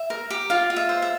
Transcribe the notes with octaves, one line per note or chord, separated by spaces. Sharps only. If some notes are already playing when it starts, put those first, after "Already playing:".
Already playing: E5
A#4
G4
F4 F5
F4
E5
C5
E5